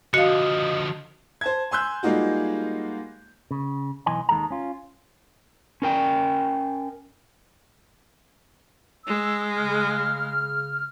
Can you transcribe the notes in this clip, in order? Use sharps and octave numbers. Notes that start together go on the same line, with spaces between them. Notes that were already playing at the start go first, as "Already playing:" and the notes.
D3 F3 F#4 D#5 F5 D#6 C#7
C5 A5 G#6
G#5 C6 E6 F#6 G6
G3 G#3 A#3 D#4 F4 F#4
C#3
B1 E3 D#5 G#5 C6
D#2 D#3 G#3 A4 A#5
C#4 F4
C#4 A#4 G5
G#3 E6
C#3 F6